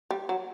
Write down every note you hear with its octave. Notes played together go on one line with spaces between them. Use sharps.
G3
F#3